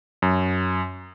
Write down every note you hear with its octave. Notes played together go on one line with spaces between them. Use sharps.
F#2